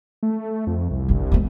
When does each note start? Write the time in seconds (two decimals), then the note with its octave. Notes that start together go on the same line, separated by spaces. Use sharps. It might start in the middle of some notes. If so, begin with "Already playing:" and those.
0.23 A3
0.67 F2
0.91 C2
1.08 G1 F2
1.32 G#3 B3